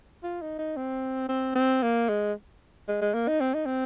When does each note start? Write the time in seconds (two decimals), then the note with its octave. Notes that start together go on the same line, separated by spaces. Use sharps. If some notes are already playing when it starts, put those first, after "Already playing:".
0.23 F4
0.41 D#4
0.59 D#4
0.77 C4
1.29 C4
1.56 C4
1.83 A#3
2.09 G#3
2.88 G#3
3.02 G#3
3.14 A#3
3.28 D#4
3.41 C4
3.54 D#4
3.66 C4